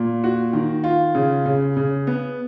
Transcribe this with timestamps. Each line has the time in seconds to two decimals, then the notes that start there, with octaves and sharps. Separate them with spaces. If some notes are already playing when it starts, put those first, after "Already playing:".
Already playing: A#2
0.24 F#4
0.53 D#3
0.84 F4
1.15 C#3
1.46 C#3
1.77 C#3
2.07 B3